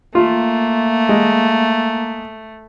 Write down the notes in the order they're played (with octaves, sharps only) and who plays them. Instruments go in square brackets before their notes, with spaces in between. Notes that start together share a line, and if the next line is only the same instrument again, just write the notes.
[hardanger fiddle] A3 [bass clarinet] A#3 [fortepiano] F4
[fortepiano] G#3